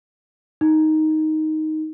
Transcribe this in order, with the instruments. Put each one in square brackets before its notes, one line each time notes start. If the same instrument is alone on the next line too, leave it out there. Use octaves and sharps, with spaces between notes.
[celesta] D#4